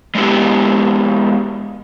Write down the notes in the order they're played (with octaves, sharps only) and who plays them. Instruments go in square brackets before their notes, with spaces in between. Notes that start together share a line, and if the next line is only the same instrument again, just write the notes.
[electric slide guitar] G#3 A3 B3 D#4 E4 G4